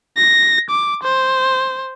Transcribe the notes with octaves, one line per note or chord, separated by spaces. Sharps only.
A#6
D6
C5